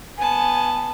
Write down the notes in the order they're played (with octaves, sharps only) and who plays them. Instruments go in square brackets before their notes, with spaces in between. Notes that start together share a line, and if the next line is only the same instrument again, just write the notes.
[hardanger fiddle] B3 A5 [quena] G#5